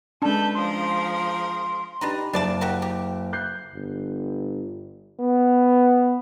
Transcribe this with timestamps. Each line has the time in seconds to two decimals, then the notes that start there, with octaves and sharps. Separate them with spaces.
0.22 G#3 C#4 D4 A4 B4 A5 G6
0.54 F3 G#4 A#4 C6
2.01 D4 D#4 G4 B4 A#5
2.33 F#1 D4 D5 A5 D7
2.61 F#4 G4 A#4
2.82 G4
3.33 F#6 G6 C7
3.74 G1
5.20 B3